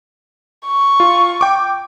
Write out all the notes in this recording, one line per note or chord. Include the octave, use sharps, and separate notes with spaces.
C#6
F4
G5 D6